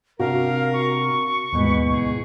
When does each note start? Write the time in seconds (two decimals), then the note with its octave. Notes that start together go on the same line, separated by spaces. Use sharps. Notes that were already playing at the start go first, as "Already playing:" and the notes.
0.20 C3 D4 F#4 A#4 F5
0.73 C#6
1.52 D#2 G#2 B2 E3 B4
1.90 D2 G#4